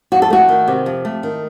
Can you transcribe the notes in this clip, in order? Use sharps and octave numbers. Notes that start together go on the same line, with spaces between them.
F2 F#4
A4
A3 F#4
D#3
C3
F2
A3
D#3